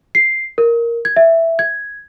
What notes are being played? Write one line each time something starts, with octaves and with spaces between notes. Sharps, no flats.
C7
A#4
G#6
E5
G#6